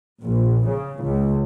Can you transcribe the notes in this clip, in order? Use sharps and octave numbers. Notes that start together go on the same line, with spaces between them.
A#1
C#3
C#2